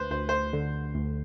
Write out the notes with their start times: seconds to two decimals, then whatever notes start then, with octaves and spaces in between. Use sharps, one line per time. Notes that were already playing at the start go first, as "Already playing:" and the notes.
Already playing: D2 B4 C5
0.11 D2 C5
0.29 C5
0.53 D3
0.95 D2